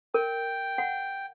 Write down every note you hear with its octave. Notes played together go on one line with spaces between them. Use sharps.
A#4 G5
F#5